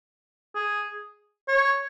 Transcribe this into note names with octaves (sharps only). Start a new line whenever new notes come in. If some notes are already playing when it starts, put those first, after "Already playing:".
G#4
C#5